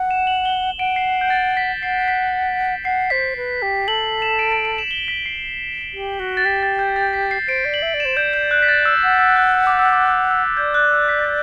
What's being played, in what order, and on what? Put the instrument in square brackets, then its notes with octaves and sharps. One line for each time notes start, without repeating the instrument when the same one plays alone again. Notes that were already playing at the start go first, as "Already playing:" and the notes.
Already playing: [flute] F#5
[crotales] E7
F#7
G7
[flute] F#5 [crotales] D7
[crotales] C7
G6
A6
B6
[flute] F#5 [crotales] C7
[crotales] B6
[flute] F#5 [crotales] C7
[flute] C5 [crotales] B6
[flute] B4
G4
[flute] A4 [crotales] F#7
[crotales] E7
D7
D7
D7
E7
G7
B6
C7
[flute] G4
F#4
[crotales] A6
[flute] G4 [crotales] B6
[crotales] A6
G6
A6
B6
C7
[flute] C5 [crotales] D7
[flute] D5
[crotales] F#7
[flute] E5
D5
[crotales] E7
[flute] C5
[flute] D5 [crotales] G6
[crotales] G6
F#6
B6
A6
E6
[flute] F#5 [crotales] E6
[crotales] E6
F#6
E6
D6
E6
D6
E6
E6
[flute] D5 [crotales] G6
[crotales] F#6
E6
B6